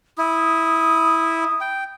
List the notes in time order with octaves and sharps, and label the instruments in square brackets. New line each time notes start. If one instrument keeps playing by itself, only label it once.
[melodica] E4 [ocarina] D#6
[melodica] G5